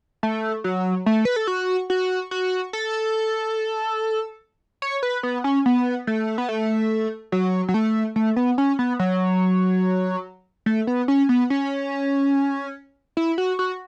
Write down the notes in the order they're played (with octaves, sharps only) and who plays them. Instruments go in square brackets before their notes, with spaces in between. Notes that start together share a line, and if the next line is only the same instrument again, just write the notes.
[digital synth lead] A3
F#3
A3
B4
A4
F#4
F#4
F#4
A4
C#5
B4
B3
C#4
B3
A3
B3
A3
F#3
F#3
A3
A3
B3
C#4
B3
F#3
A3
B3
C#4
B3
C#4
E4
F#4
F#4